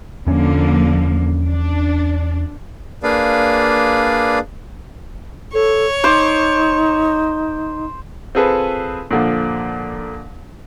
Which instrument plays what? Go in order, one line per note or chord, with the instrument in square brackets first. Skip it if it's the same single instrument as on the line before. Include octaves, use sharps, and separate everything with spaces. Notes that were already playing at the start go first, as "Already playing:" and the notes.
[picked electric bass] E2 C#4 [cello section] D3 F3 A#3
[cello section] D4
[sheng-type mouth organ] A#3 D4 G#4 B4 D5 F5
[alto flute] A4 [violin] C#5
[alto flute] D#4 [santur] C5 D6
[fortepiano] C4 F4 G#4 A4 B4
A#2 D3 F3